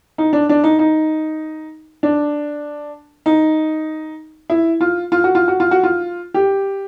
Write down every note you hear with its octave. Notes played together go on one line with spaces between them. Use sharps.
D#4
D4
D4
D#4
D#4
D4
D#4
E4
F4
F4
F#4
F4
F#4
F4
F#4
F4
G4